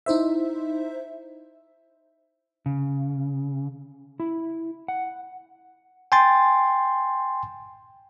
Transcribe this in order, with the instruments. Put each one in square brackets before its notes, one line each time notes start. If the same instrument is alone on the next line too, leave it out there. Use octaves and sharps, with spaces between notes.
[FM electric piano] D#4 E4 C5 E5
[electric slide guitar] C#3
E4
F#5
[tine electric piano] G5 G#5 C6 A6